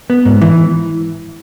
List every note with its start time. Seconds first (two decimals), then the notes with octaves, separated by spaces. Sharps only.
0.10 B3
0.25 G#2
0.41 E3